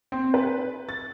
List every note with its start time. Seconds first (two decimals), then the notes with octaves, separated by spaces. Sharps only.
0.12 C4
0.34 B4
0.89 A6